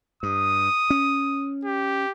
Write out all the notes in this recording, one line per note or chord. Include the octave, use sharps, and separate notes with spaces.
G2 D#6
C#4
G4